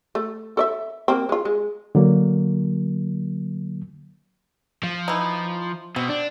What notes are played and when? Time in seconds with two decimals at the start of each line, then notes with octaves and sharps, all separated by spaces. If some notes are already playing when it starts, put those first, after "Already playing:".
0.15 A3
0.57 A4 D5 E5
1.08 A#3 C4
1.29 G#3 F4
1.45 G#3
1.95 D3 F#3 A#3
4.83 F3
5.08 E3 D#4
5.96 B2 C4
6.09 D4